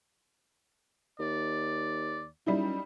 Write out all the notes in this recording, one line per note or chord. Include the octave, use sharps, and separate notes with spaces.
D#2 D5
F#2 G3 D#4 E4